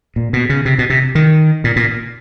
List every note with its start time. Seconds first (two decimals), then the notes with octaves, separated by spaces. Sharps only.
0.16 A#2
0.33 B2
0.49 C#3
0.65 C3
0.79 B2
0.90 C3
1.15 D#3
1.64 A#2
1.76 A#2